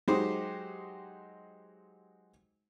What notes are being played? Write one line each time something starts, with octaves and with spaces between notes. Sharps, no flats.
F#3 G#3 D#4 G4 C5